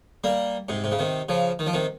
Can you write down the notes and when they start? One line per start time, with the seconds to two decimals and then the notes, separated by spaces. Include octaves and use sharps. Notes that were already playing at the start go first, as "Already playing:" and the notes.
0.24 G3 A#3
0.69 G#2 C3
0.84 C3
0.91 C#3
0.99 C3 D#3
1.29 C#3 F3
1.59 D#3
1.67 F3
1.73 C3 D#3